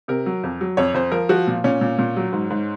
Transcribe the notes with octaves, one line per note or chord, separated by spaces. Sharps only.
C3 A#4
F#3
F2
F#3
F2 C#5
F2 C5
F3 A#4
F3 F#4
A#2
A#2 C#4
A#2
A#2
F#3
G#2
G#2